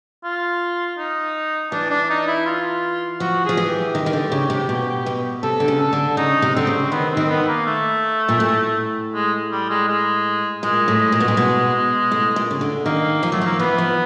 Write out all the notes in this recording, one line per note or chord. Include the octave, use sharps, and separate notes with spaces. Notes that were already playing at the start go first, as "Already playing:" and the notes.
F4
D#4
E3 D4
D4
D#4
E4
F4
F3 F#4
F3 G#4
E3
G4
D#3
D#3
D3
C#3
C3
B2
B2
C3 A4
D3
C#3
A4
D3
C#3 D#4
C3
D3 C4
C#3
D#3 B3
C4
D#3
B3
A#3
A3
A#2
A2
G#3
G3
G#3
G#3
A#2 G#3
A2
A#2
B2
A#2
B2
A2
A#2
C#3
D3
D#3 A#3
F3
F#3 A3
F3 A#3
E3 B3
F3